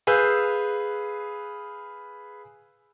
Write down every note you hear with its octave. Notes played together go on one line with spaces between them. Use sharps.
G#4 B4 F5 E6 G6